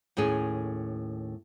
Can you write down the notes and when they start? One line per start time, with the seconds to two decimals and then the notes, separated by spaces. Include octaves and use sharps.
0.17 D#2 A2 C#4 G#4